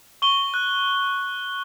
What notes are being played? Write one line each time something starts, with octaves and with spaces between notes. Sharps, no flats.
C#6 G7
F#6